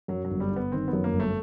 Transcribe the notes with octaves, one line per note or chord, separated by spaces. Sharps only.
F#2 F#3
F#3
G1
G3
G1
B3
D#3 C4
B3
F#2
A#3
G1
A3